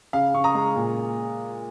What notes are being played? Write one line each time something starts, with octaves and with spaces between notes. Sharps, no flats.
C#3 F5
C#3 C#6
A#5 D#6
G#3
A#2